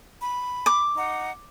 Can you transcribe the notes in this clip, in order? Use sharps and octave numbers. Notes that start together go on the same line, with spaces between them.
B5
D6
D#4 F#5